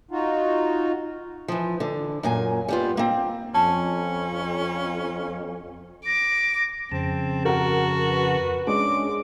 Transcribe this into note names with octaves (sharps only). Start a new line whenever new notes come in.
D#4 F4 F#4
E3 F3
D3
F#2 A#2 G#5
G3 B3 F4
A#3 C4
F2 C#4 A5
D6 A#6
F2 C#3 C4 A5
F#4 A#4 F#5
B4
G#3 C#4 D4 D6